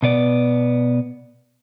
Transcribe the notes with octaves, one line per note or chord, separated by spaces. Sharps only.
B2 B3 D5